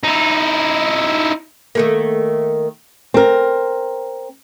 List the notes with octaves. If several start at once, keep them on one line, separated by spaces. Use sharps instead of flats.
D#4 E4
D#3 A3 A#3
C4 A#4